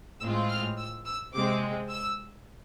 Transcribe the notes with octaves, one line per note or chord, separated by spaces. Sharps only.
A2 G#3 C4 F4 E6
F6
E6
E6
C3 G#3 C4 D6
E6